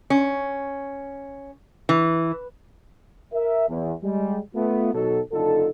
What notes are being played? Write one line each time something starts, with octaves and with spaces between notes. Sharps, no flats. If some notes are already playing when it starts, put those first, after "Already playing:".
C#4
E3
A#4 E5
E2
G3 G#3
A3 B3 F4
B2 F#3 D#4 F#4 A4
F#1 D3 D#4 F4 A4